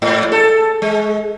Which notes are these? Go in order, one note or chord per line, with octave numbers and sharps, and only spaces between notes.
G#2
A4
G#3